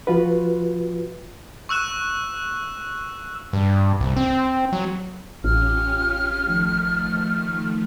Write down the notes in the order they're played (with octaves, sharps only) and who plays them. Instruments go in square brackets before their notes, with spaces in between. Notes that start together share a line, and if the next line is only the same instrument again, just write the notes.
[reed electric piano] F3 F4 F#4 B4
[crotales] C#6 E6 F#6 E7
[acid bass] G2
C2
C4
F#3
[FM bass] A1 [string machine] C#4 F4 G4 [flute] F6
[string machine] D#3 F3 A3